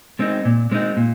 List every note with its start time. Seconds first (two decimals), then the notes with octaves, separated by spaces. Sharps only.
0.19 G#3 C4 D#4
0.45 A#2
0.71 G#3 C4 D#4
0.97 A#2